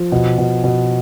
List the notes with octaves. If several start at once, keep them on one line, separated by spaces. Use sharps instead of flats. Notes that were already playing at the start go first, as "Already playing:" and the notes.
Already playing: F3
B2
B2
B2